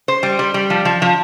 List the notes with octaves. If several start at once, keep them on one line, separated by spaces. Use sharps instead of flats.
C5
G3
G3
G3
F3
F3
F3